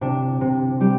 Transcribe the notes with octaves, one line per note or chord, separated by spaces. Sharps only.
C3 D4
C3
G3 G4